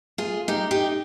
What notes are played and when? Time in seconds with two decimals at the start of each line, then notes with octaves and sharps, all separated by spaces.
0.18 F4 G#4
0.48 D#4 G4
0.71 D#4 G4